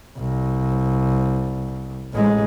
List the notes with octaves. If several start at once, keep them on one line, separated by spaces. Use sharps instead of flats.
C2
A1 G#3